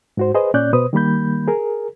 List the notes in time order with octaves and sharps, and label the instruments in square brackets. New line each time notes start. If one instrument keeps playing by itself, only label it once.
[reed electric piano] G#2 F#4 C5
G#4 B4 C5 D#5
A#2 C#4 D5 F#6 G6
B2 B4 C5 D#6
D#3 G3 A#3 B5 G6
G#4 A#4